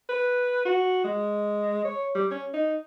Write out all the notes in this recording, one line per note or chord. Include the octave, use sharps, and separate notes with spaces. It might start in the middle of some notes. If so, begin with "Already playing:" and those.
B4
F#4
G#3
C#5
G3
C#4
D#4